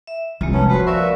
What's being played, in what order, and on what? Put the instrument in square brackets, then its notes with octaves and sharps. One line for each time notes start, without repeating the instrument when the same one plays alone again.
[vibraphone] E5
[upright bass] C2 [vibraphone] G#3 A#3 F4
[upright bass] F3 [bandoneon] B3 C#4 [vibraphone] A5
[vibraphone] F#4 C5 C6 [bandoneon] B4
[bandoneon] F#4 E5 [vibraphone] A#4 D5 F5